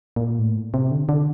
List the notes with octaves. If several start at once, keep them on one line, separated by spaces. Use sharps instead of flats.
A#2
A2
C3
D3
D3